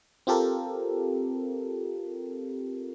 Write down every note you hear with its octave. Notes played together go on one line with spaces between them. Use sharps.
C4 F4 G4 A4 A#4